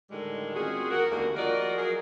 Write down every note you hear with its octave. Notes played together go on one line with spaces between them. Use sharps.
A2 D3 D#3 G3 G#3
C4 C#4 F4 F#4 G#4
E2 F#4 A#4
D2 D3 D#3 G3 G#3 A#3
F3 F4 F#4 A#4 D5 D#5
F#3 G#4 A#4